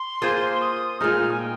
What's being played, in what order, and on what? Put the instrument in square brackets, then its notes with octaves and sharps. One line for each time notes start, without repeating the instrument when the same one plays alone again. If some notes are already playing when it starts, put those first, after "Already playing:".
Already playing: [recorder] C6
[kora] A#3 F4 G#4 C5
[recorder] D#6
[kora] A#2 G#3 D#4 [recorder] F6
[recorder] G#5
G5